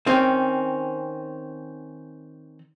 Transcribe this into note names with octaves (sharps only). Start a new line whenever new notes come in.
D#3 C4 C#4